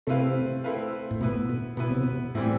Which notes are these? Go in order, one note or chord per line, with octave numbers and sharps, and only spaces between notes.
C3 A3 C4 E4 B4 F5
A3 C4 E4 B4 F5
A2
B2 B3 E4 B4
B2
B2 B3 E4 B4
C3
B2
A2 E3 G3 C4 E4